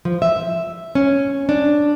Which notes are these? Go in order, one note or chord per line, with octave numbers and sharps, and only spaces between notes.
F3
E5
C#4
D4